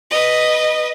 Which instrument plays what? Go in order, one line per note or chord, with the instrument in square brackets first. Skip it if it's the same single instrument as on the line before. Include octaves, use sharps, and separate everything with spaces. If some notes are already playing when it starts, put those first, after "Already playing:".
[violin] B4 D#5